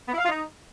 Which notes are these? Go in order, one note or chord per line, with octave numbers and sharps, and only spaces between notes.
B3
E4
F5
F4
D#4